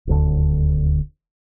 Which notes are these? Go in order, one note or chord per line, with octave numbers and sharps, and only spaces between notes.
D#1 D2 D3